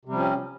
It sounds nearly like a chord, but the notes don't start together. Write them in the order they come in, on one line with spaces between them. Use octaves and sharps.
C3 G3 F3 C#4 C4